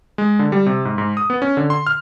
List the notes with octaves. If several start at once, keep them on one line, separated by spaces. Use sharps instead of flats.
G#3
D3
G3
C3
G#2
G#2
D#6
B3
C#4
D3
C6
F6